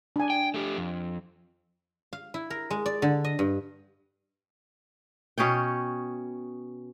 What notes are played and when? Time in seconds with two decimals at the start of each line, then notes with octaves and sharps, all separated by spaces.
0.16 D4 G#5
0.30 G5
0.54 A3 G4
0.77 F2
2.13 F5
2.34 E4
2.50 A#4
2.70 G#3
2.86 D5
3.02 D3
3.24 D#5
3.39 G2
5.38 B2 C#4 C#5 G5